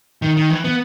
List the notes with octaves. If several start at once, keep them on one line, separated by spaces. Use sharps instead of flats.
D#3
D#3
E3
B3